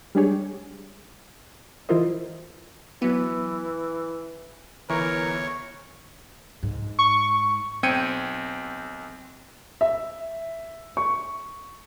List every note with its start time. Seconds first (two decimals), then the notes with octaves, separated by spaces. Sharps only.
0.15 G3 G#3 D4 G4 G#4 C#5
1.89 E3 E4 F4 A#4 C5 D#5
3.02 E3 F#3 B3
4.90 G1 E3 A#4 C#5
6.63 G#2
6.99 C#6
7.83 B1 C4 G5 G#6 C#7 D#7
9.81 E5
10.97 C#6